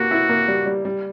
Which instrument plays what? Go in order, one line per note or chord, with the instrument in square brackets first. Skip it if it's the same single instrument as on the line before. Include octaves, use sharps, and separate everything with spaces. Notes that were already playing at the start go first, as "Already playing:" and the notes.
Already playing: [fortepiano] A#3 G4 [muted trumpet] F#4
[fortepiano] E4
A#3
G3
G3
G3